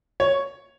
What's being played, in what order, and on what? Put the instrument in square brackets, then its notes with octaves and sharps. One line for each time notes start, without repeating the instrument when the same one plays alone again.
[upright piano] C#5